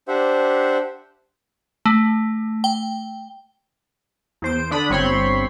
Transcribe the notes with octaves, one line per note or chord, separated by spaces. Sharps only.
D4 G4 C5 E5 F#5
A3
G5
E2 C5 D7
D3 D4 B5 D#6
G1 C4 C#5 B5 C6